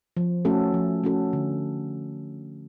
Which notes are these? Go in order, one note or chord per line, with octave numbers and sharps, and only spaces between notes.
F3
A3 C#4 F#4 A4
F3
A3 C#4 F#4 A4
D3